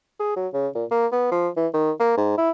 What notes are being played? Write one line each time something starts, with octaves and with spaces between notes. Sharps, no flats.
G#4
F#3
C#3
A#2
A#3
B3
F3
E3
D#3
A#3
G#2
E4